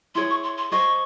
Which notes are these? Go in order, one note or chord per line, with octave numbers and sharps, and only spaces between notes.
E4 G#4 C#5 C6
C#6
C6
C6
G#4 C5 D#5 G5 C#6